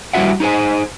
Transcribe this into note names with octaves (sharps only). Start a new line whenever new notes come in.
G3 A3 E4 F#4 E5 F#5
D#4 G4 G#4 C5 G#5